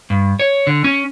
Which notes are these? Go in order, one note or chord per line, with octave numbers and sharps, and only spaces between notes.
G2
C#5
D3
C#4